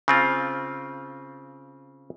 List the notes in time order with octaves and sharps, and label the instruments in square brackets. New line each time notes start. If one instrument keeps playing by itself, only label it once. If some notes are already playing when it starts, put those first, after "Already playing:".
[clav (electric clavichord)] C#3 C4 F4